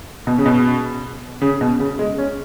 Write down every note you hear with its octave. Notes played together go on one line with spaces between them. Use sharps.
B2
C#3
B2
C#3
B2
C#3
G#3
C#4